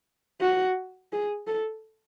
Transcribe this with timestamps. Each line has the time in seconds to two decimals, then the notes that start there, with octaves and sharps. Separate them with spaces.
0.41 F#4
1.12 G#4
1.47 A4